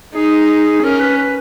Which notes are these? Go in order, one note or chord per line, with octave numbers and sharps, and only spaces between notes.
D#4 G#4
C#4 A#4
B4
B4